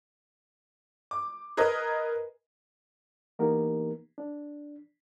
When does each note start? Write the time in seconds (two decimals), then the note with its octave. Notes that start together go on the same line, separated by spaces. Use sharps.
1.11 D6
1.57 G#4 A#4 B4 D#5
3.39 E3 A#3 B3 D#4 G4 A#4
4.18 D4